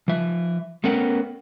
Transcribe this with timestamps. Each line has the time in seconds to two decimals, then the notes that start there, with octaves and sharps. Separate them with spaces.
0.08 F3 E5
0.84 A3 B3 C#4 A#4 F#5 G5